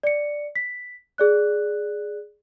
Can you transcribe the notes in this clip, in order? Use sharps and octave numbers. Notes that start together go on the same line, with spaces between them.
D5 C#7
B6
G#4 D5 F#6